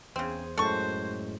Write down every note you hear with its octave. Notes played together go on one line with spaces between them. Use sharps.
E2 C#3 C4 G#4 C5
F#2 A2 G#3 F#4 A4 C5 C#6